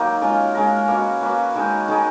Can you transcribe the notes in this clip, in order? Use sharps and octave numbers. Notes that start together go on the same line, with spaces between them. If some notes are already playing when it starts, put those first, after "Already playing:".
Already playing: D#3 F#3 A#3 D#4
G#3 C#4 F4 A#4
G#3 C#4 F4 A#4
A#3 C#4 F#4 B4
A#3 C#4 F#4 B4
D#3 G#3 D#4
D#3 G#3 D#4